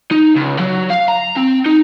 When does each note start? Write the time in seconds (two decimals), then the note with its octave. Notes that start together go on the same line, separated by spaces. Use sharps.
0.12 D#4
0.36 C#2
0.59 F#3
0.90 F5
1.08 A#5
1.37 C4
1.66 D#4